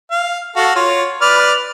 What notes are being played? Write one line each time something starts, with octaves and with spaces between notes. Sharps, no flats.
F5
F#4 A4 F5
F4 C#5
B4 D5 F6